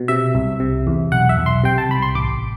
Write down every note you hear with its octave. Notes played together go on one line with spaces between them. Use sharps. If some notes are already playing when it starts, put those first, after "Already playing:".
Already playing: B2
C3 E5
C2
C3
E2
B1 F#5
E5
B1
C6
C3 G5
A5
C2 B5
C6
A1 D6